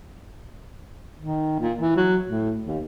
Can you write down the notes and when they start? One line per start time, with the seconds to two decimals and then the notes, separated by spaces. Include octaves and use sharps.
1.19 D#3
1.60 A#2
1.80 E3
1.96 F#3
2.26 A2
2.67 D#2